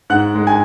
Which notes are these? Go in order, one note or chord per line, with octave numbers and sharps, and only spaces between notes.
G#2 F#5 F#6
G#3
G#5 G#6